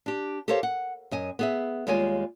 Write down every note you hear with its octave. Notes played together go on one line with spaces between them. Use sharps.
D4 G4
G4 A4 A#4 C5 C#5 F5
F#5
F#2 D#5 G#5
B3 G#4 E5
D#2 G3 G#3 F4 C#5 G#5